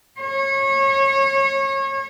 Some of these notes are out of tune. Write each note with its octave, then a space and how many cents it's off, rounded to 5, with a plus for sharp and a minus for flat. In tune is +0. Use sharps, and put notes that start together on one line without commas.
C#5 -30